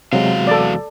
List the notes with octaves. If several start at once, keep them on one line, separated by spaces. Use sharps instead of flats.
E2 C3 F#3 G#3 F#4 F5
A4 D5